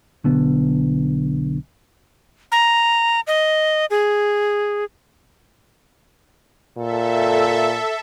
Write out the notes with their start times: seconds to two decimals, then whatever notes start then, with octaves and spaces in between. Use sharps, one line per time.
0.24 B1 D3 B3
2.52 A#5
3.27 D#5
3.91 G#4
6.78 A#2 A4 E5